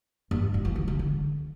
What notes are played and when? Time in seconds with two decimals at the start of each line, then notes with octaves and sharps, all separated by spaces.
0.31 G2
0.54 G2
0.65 E3
0.76 D3
0.88 C#3
0.99 D3